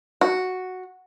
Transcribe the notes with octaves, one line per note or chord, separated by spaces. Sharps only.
F#4